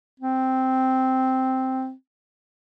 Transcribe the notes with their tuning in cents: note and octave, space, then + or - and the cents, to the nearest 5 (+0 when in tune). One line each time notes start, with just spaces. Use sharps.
C4 -5